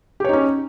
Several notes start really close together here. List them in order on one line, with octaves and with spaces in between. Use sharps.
G4 C#5 D#4 C#4